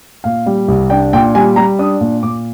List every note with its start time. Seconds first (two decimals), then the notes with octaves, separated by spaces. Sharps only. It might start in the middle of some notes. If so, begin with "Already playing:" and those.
0.24 A#2 F5
0.46 G3
0.68 C2
0.90 D4 G5
1.13 A#2 G5
1.35 G3 G#5
1.56 G3 A#5
1.79 D4 D#6
2.01 A#2
2.23 A#2 D6